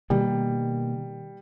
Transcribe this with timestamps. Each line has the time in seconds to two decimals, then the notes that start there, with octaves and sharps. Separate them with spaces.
0.10 B2 D#3 G3 A#3